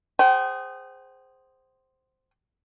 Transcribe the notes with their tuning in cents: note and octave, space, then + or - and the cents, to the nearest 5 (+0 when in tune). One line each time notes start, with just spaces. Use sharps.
G#4 -10 C5 +0 G5 -45